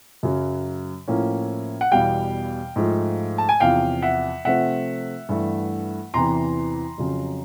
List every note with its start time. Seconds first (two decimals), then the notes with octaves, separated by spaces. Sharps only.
0.23 F#2 C#3 F#3
1.08 A2 F3 A#3 C#4
1.81 F#5
1.91 E2 B2 G3 F5 G5
2.76 G#2 F3 A3
3.38 A5
3.49 G#5
3.60 E2 C3 F3 F5 G5
4.02 E5 F#5
4.45 C3 F3 A3 C4 E5 F#5
5.29 G2 E3 A3
6.14 E2 C3 E3 A#5 C6
6.98 F2 C#3 F#3